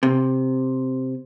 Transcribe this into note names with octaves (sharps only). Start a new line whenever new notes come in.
C3